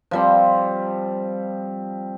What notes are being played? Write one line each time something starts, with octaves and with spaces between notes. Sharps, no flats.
F3 G3 C4